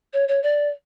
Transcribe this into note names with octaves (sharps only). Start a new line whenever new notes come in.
C#5
C#5
D5